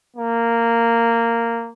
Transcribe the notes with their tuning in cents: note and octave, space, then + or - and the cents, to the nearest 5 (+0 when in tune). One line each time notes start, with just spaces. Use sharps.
A#3 -10